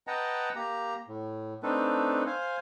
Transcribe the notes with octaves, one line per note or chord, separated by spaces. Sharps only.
B4 D#5 F#5 G5 A5 A#5
A#3 G4 A#5
A2
A3 C4 D4 D#4 A4 B4
C5 F5 G#5